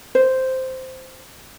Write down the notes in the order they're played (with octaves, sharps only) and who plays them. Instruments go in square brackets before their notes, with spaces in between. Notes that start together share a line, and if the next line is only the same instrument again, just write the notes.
[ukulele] C5